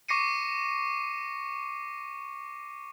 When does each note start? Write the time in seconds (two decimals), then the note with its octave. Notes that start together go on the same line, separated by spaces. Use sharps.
0.08 C#6 D6 A#6 C7 C#7 D#7